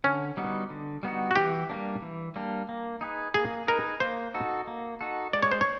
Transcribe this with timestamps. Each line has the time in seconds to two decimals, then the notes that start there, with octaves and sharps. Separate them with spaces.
0.04 D3 C#4
0.37 G3 B3 D#4 F#4
0.70 D3
1.03 G3 B3 D#4 F#4
1.31 F#4
1.36 E3 G4
1.70 G3 A#3 D4
2.02 E3
2.36 G3 A#3 D4
2.69 A#3
3.01 D#4 G#4 B4
3.34 A#3 G#4
3.67 D#4 G#4 A#4 B4
4.00 A#3 C5
4.34 D#4 F#4 A4
4.67 A#3
5.01 D#4 F#4 A4
5.33 G#3 D5
5.43 C#5
5.52 C5
5.61 C#5